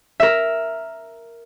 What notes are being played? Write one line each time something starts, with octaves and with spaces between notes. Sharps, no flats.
A#4 E5